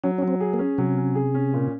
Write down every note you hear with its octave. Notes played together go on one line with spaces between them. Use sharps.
F#3 C#4
C#4
F#3
C4
G#4
A#3
C#4
C3 F#3
C#4
G#4
C#4
A#2